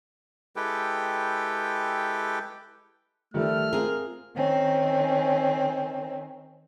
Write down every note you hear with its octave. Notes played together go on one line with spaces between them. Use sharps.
G#3 E4 G4 A4 B4 G5
D#3 F3 G3 A3 F6
C4 F4 G#4 A#4
D#3 C4 C#4